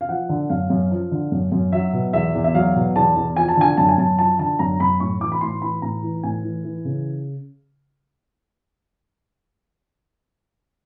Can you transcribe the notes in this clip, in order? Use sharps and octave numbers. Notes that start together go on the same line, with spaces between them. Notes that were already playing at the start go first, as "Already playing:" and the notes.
F5
F3 F#5
D3
F#2 F5
F#2
F3
D3
F#2
F#2
F#3 E5
B2
E2 E5
E2
E5
F#3 F5
B2
E2 A5
E2
F3 G#5
A5
D3 G#5
F#2 A5
G#5
F#2 A5
F3 A5
D3 A5
F#2 A#5
F#2 B5
A2 C#6
E3 D6
B5
A2 C6
E3 B5
A2 A#5
E3
A2 G#5
E3
E3
C#3